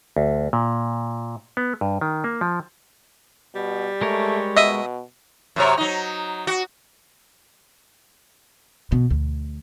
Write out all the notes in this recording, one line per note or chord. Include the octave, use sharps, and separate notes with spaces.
D2
A#2
B3
G2
D#3
A#3
F3
B2 G3
G#3 A3 A#4 C#5
B2 D#5 E5 D#6
F#2 C3 C#5
F#3 D#4
F#4
B2
D2